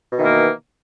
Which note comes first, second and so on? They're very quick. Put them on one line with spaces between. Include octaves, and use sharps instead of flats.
B2 D#3 E3 A#3